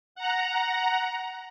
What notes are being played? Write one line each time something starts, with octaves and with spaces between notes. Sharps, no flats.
F#5 A#5